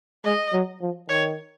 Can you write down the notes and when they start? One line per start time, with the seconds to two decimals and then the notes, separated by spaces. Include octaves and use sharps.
0.25 G#3 D#5
0.53 F#3
0.81 F3
1.09 D#3 C#5